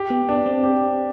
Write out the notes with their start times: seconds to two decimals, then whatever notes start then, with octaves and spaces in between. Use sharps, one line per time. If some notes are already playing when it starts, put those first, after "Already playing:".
Already playing: G4
0.10 B3
0.29 B3 D4
0.46 C4
0.63 G4